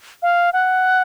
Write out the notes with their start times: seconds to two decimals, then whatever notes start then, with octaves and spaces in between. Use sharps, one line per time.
0.23 F5
0.53 F#5